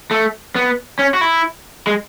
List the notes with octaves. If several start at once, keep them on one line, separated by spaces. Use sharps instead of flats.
A3
B3
C#4
F#4
E4
G#3